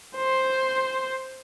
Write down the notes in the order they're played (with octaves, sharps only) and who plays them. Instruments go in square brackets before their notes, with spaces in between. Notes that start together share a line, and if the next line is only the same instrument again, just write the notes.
[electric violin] C5